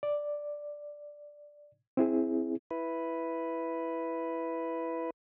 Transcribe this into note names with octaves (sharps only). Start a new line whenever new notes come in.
D5
C4 E4 G#4
E4 B4